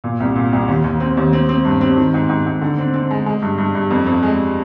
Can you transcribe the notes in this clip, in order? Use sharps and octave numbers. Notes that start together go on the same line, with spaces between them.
A#2
C2
A#2
C2
D#2
D#2
C4
D#2
C4
C4
G2
C4
D#3
G#2
G#2
G#2
D3
C4
C4
G#3
G#3
G2
G2
G2
F2
F2
G#3